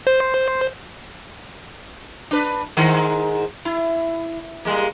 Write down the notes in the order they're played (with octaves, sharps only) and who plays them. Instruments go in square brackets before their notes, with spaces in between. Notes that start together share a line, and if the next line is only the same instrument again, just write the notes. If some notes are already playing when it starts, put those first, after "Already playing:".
[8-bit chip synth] C5
[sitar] D4 B4
G#2 D#3 A#4
E4
G3 G#3 A#3